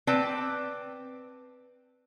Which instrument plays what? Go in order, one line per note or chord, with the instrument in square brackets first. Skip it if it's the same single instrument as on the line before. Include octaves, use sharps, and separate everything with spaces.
[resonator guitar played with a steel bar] C4 B4 D5 G5 A5